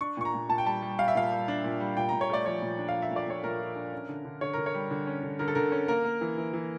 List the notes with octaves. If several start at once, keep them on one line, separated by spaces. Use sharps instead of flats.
D4 C#6
A#2 C#6
A#5
A#2
A#2 A5
G5
G3 A5
G3
G3 F5
E5
A#2 F5
G3
D4
A#2
G3
A#2 G5
A#2 A#5
C#5
A3 D5
F3 C#5
A#2
D4
F5
F3
E5
A#2
D5
A#2 C#5
A#2 A#4
F3
D4
C#4
D3
D3
D3 C#5
D3 A#4
C#5
G3
D3
C#4
D3
D3 A#4
A4
D3 A#4
C#4
A#3 A#4
A#3
E3
E3
E3